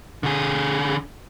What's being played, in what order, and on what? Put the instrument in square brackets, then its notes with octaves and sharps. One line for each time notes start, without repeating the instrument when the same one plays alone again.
[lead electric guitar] D3 G#4